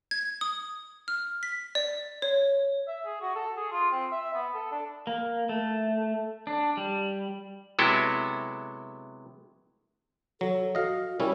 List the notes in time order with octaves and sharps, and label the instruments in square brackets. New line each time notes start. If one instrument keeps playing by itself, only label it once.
[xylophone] G#6
D#6
F6
B6
D5
C#5
[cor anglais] E5
G#4
F#4
A4
G#4
F4
C4
E5
B3
A4
D4
[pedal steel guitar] A#3
A3
D4
G3
[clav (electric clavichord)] C3 F#3 G#3 B3 E4 A4
[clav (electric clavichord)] F#3 [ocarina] A4
[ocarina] F#4 [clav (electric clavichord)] D#5 F5
[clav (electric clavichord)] G3 C#4 E4 [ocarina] A#4